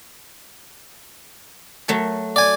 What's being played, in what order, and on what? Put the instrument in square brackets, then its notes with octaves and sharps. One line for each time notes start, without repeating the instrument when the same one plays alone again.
[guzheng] F#3 A3 A4
[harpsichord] D5 G#5